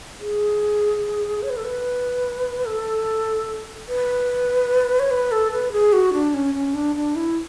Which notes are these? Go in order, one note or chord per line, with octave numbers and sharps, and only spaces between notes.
G#4
C#5
B4
A4
B4
A4
B4
C#5
B4
A4
B4
G#4
F#4
D4
C#4
C#4
D4
D4
E4